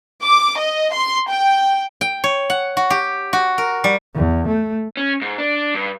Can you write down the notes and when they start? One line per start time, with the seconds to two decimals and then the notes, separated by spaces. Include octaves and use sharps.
0.23 D6
0.59 D#5
0.93 C6
1.31 G5
2.01 G5
2.24 C#5
2.50 F#5
2.77 F#4
2.90 G4
3.33 F#4
3.58 A#4
3.84 G3
4.15 E2
4.48 A3
4.97 C#4
5.22 G#2
5.38 D4
5.75 G2